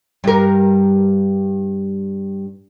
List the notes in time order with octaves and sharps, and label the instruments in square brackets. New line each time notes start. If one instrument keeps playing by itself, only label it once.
[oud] G2 A#4